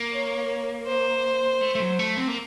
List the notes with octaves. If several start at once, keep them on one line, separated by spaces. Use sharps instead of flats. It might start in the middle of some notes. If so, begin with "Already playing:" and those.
Already playing: A#3
C#5
C5
A3
A3
F#3
A3
C4
A#3